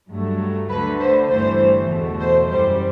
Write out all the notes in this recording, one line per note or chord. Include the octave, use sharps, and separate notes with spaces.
G2 F#3 A3
D2 D3 A3 B4
C5
G1 G2 E3 A3 C5
E2 B2 A3
C5
F#2 E3 G3 C5